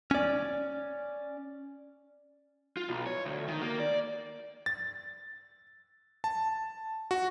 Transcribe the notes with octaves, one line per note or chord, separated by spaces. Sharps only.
C#4 D5
F4
B1
C#5
D2
D#3
A#3
D5
A6
A5
F#4